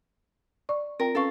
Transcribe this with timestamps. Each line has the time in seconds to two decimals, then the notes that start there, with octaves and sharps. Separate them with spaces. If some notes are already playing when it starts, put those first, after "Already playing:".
0.69 D5 C#6
1.00 C4 F4 A#4 G5
1.15 C#4 A4 B4 F5 C#6